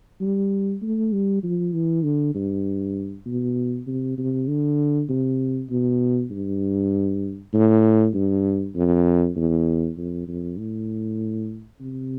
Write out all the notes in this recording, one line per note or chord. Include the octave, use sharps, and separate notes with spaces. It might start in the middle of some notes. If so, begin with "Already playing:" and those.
G3
A3
G3
F3
E3
D3
G2
B2
C3
C3
D3
C3
B2
G2
A2
G2
F2
E2
F2
F2
A2
C3